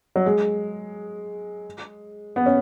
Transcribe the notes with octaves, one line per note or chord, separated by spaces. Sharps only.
F#3
G#3
B3
C#4